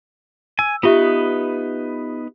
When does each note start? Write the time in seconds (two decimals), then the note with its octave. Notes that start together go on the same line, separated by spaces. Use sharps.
0.59 G#5 E6
0.83 B3 D#4 F4 G4 B4 E5